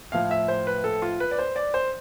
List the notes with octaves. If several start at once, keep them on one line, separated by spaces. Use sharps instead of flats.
A2 F3 F5
E5
C5
B4
A4
F4
B4
D5
C5
D5
C5